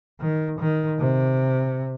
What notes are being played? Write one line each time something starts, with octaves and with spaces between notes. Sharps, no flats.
D#3
D#3
C3